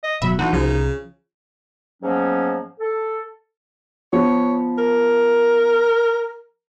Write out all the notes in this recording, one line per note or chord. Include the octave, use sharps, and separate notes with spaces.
D#5
D1 B2 F#3 E5 B5
D2 D#3 E3 D#4 F#4
C2 C#3 F3
G#2 F3 F#3 A#3 B3 C#4
A4
F3 B3 C#5
A#4